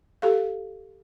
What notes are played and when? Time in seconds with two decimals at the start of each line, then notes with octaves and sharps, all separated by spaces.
0.22 G4 A4 F5